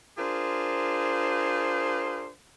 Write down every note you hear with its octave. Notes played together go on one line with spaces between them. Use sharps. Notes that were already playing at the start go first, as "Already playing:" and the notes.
D4 F4 G#4 A#4 C5